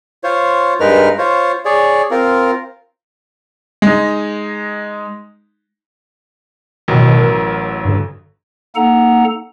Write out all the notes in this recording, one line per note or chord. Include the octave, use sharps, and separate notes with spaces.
F4 C5 C#5
G2 G#3 D#4 A#4 B4 F6
F4 C5 C#5
G#4 C#5 D5
C4 F4 A#4
G#3 D#4
A1 B2 D#3 F#3
A#4
G2 D3
A#3 D#4 A4 F#5 A#5